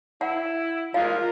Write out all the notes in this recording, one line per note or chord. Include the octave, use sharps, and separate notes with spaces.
E4 F#5
F3 G3 G#3 F4 A#4 F5